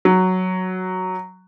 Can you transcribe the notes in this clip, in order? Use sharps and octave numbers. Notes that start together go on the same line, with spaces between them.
F#3